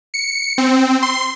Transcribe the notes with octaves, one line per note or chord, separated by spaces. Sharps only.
C#7
C4
C6